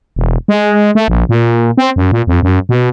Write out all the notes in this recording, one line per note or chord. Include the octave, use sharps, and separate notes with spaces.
E1
G#3
A3
A#1
A#2
C4
F#2
A#2
F2
F#2
B2